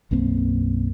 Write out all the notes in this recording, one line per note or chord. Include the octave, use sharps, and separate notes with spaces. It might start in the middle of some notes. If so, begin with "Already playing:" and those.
B1 F#2 A#3 C4